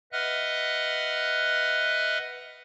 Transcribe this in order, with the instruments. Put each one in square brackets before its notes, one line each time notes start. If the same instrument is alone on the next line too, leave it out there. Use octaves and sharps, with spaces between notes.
[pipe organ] B4 D#5 E5 F#5 F6 F#6